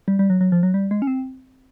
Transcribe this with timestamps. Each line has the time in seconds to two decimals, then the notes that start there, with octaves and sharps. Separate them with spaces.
0.08 G3
0.19 G3
0.30 F#3
0.41 F#3
0.52 F3
0.63 F#3
0.74 G3
0.91 G#3
1.02 C#4
1.07 C4